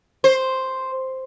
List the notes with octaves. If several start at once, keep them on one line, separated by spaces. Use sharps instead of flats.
C5